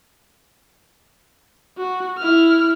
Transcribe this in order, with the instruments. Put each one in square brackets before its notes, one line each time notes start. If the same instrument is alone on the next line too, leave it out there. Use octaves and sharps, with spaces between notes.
[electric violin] F#4
E4 F6